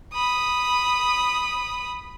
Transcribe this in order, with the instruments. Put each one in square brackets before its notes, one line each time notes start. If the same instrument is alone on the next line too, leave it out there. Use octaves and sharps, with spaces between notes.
[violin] B5 D#6